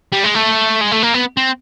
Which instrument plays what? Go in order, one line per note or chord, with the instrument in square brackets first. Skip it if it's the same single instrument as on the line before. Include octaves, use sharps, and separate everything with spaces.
[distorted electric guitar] G3
G#3
A3
G#3
A3
A#3
B3
C4